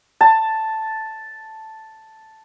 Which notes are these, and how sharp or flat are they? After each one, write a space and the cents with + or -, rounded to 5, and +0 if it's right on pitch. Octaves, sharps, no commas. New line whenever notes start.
A5 +0